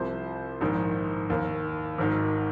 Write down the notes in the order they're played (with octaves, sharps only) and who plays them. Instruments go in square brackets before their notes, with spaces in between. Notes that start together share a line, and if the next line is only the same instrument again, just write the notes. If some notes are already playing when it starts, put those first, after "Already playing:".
Already playing: [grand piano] C2 C3 F3 C5
A#1 G#2 D#3
D#2 D#3
G#1 G#2 D#3